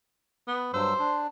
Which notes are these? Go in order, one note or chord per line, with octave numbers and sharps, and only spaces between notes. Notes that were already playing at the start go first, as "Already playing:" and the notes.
B3
G2 F#3 C5 E6
D4